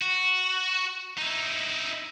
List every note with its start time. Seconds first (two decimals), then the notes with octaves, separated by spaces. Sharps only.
0.01 F#4
1.18 D#4 E4